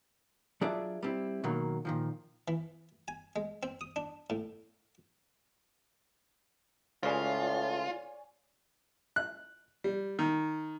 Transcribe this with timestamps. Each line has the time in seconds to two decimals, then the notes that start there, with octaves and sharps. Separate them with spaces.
0.61 F#3 D4 F4 G#4 D5 E5
1.03 G3 C4 E4
1.44 B2 D#3 F#3 A#3
1.85 A#2 D#3 F3
2.48 E3
3.08 G#5
3.36 G#3
3.63 C4
3.81 D#6
3.96 D4
4.30 A2
7.03 C#2 A2 C#3 F4 C#5 D5 G#5
9.16 F#6
9.84 G3
10.19 D#3